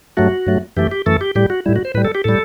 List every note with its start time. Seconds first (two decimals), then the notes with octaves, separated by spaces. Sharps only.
0.17 G2 F#3 A3 F#4
0.46 G2 F#3 A3
0.77 F#2 E3 A3 G4
0.91 G4
1.06 F#2 E3 A3 A4
1.21 G4
1.35 A2 G3 G4
1.50 F#4
1.66 A2 G3 E4
1.76 F#4
1.85 C5
1.94 A2 B4
1.97 G3
2.05 A4
2.15 G4
2.24 A2 G3 A4